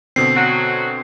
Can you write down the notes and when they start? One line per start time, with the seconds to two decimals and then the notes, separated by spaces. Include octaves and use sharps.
0.16 B2 D3 C4 C7
0.36 F#3 F#4